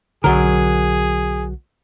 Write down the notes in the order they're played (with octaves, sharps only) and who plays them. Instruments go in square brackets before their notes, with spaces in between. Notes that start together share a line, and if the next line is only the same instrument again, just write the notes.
[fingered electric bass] B1 D3 [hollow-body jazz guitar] F#3 A#4 [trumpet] G#4